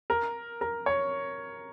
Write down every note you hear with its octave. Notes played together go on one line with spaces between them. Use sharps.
A#4
A#4
C#5